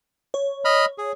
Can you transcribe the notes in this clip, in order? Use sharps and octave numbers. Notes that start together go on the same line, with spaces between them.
C#5
D#5 B5 F6
G#4